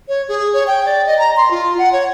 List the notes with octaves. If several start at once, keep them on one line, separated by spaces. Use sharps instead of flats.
C#5
G#4
C#5
G5
D5
D#5
A#5
C6
F4
F#5
C#5